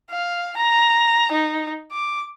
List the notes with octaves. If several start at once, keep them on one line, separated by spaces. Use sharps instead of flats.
F5
A#5
D#4
D6